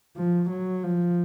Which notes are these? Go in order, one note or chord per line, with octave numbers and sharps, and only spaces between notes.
F3
F#3
F3